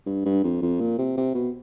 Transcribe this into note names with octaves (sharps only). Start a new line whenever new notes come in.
G2
G2
F2
F2
A#2
C3
C3
B2